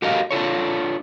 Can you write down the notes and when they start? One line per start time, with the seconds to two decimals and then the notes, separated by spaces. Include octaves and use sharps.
0.02 F#4 G4 A4 A#4 D#5 F5
0.31 D4 F4 A4 C#5